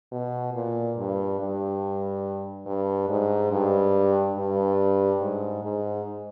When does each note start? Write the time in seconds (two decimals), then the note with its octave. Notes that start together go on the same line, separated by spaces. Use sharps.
0.12 B2
0.54 A#2
0.97 G2
1.39 G2
2.66 G2
3.09 G#2
3.52 G2
4.37 G2
5.20 G#2
5.63 G#2